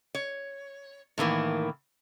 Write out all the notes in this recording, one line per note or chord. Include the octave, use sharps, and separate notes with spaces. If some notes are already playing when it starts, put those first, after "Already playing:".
C#5
A2 D#3 E3 A#3